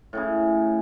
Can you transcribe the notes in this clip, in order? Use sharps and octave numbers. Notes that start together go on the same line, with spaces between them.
A2 C#3 G#4